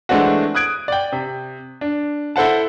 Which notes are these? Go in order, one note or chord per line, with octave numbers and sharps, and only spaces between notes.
E3 G#3 A3 C4 D4 F#4
D#6 F#6 G#6 D7
D5 G5
C3
D4
E4 A4 C5 F#5 A5